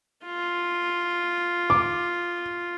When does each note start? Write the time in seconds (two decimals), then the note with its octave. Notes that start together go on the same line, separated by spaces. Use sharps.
0.25 F4
1.70 D6